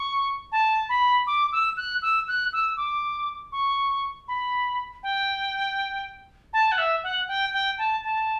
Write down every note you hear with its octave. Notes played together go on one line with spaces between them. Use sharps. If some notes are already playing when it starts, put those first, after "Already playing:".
Already playing: C#6
A5
B5
D6
E6
F#6
E6
F#6
E6
D6
C#6
B5
G5
A5
F#5
E5
F#5
G5
G5
A5
A5